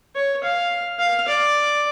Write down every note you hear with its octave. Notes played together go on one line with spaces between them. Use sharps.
C#5
F5
F5
D5